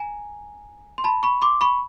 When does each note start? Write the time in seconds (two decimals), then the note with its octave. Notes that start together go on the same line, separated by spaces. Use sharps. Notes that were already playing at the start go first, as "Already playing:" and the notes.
Already playing: G#5 A#5
0.98 C6
1.04 A5 B5
1.23 B5 C#6
1.42 C6 D6
1.61 B5 C#6